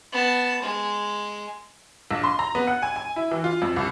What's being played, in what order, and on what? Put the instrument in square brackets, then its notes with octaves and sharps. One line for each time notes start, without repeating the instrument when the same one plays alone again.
[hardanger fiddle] B3 A5
G#3
[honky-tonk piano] A#1
C6
A#5
B3
F#5
G#5
G#5
E4
E3
F4
F2
C2